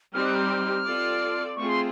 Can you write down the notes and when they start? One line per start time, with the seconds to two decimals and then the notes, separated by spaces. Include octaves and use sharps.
0.14 G3 C4 D#4 G4 F6
0.25 F#6
0.35 F6
0.86 C4 F4 A4 D5
1.56 A3 C4 F4 G#4 C#6
1.69 C6